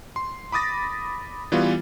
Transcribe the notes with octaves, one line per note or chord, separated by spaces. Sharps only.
C6
B5 D6 D#6 A6 A#6
E3 G3 B3 F4 F#4